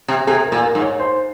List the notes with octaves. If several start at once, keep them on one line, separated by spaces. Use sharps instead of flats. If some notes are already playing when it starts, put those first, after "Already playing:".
C3
C3 G#4
A#4
A#2
A#4
G#2
C#5
C5